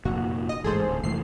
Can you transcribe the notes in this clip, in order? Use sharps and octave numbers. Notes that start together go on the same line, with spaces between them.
F1 A#2 F#4
D#5
A1 G#2 G#4 A4 C5
D1
F1 E3 A3 C7